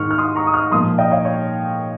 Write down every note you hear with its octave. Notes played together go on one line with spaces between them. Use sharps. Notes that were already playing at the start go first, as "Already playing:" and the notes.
Already playing: G#2 D#3 C#6 F6
F6
C6 D#6
A#5 C#6
D#6
C#6 F6
A#2 F3 C6 D#6
D#5 G5
C#5 F5
C#5